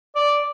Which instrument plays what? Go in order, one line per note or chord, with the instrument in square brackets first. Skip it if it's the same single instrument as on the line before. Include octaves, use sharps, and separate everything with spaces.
[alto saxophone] D5